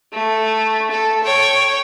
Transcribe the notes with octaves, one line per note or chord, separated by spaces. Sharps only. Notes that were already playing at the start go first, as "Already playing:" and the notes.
A3
A4
C#5 G5